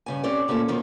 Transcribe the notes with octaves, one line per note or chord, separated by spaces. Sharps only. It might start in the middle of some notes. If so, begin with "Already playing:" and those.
G2 C#3 G#5
C4 C#4 G4 C#5 D5
D2 A#2 C#4 G4 A4
D#2 B2 D#3 F3